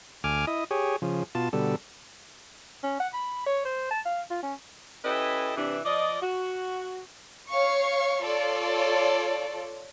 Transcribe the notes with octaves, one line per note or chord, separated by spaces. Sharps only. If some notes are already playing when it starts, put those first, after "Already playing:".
D2 G#5 D6 F6
E4 D#5
G4 G#4 C#5
C#3 F3
B2 F4 A5
B2 D3 G3 A4
C#4
F#5
B5
C#5
C5
A5
F5
F4
C#4
C#4 E4 G4 A4 B4 D#5
C3 E3 D4
F3 D5 D#5
F#4
C#5 F5 C#6
F4 A4 C#5 D5